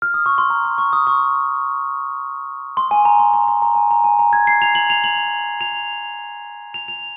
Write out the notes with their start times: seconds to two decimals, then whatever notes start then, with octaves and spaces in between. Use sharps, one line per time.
0.02 F6
0.14 D#6
0.26 C#6
0.38 C6
0.50 A#5
0.65 C6
0.78 C#6
0.93 D#6
1.07 C#6
2.77 C6
2.91 G#5
3.05 A#5
3.19 C6
3.33 C6
3.48 C6
3.62 A#5
3.76 G#5
3.91 A#5
4.04 G#5
4.19 A#5
4.33 G#6
4.47 C7
4.62 F7
4.75 F#7
4.90 F7
5.04 F#7
5.61 F7
6.74 F7
6.88 F7